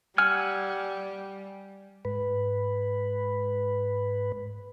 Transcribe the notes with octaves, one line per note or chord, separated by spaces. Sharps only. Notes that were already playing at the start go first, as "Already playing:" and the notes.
G3 F#5 G#5 E6 F6
G#2 B4